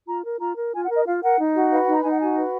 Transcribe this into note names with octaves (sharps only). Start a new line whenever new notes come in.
F4 A#5
A#4
F4 A#5
A#4
F4 G#5
F#5
A#4
D#5
F4 F5
A#4 F#5
D#4
F#4
B4 F5
F#5
D#4
A#5
D#4 G#5
F#5
F#4 G#5
B4